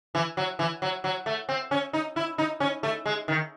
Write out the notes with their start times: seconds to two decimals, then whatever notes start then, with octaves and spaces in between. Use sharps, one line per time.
0.15 E3
0.37 F#3
0.59 E3
0.82 F#3
1.04 F#3
1.26 A3
1.49 C4
1.71 C#4
1.93 D#4
2.16 E4
2.38 D#4
2.60 C#4
2.83 A3
3.06 G#3
3.28 D#3